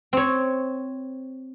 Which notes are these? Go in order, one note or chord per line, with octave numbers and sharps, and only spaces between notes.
C4 C#5